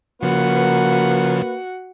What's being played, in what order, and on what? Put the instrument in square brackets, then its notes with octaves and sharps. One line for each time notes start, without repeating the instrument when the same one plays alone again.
[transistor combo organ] C#3 F3 [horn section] A#3 B4 [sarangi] F#4